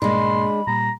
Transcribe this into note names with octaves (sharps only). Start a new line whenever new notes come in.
G#2 B2 G#3 A#3 D4 B5 C6
A#2 G3 A#5